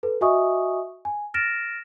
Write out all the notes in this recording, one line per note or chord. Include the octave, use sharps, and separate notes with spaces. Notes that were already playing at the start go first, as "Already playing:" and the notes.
A4 B4
F#4 D#5 E5 G#5 C#6 D#6
G#5
F6 A6 A#6 D7 E7